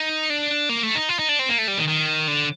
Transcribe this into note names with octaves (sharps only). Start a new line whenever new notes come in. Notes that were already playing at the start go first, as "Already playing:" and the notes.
Already playing: D#4
D4
A#3
A3
D#4
F4
D#4
D4
C4
A#3
A3
G3
D#3
D#3
D3